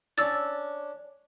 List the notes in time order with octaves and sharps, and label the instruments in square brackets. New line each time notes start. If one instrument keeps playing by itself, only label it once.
[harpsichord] C#4 D4 [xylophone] E6 A6